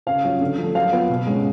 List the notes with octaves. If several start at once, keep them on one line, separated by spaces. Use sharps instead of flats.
C#3 F5
F#3 C#4 F4
D3
F3 A3
F#3 F5
B3 F4
B2
G#3 C#4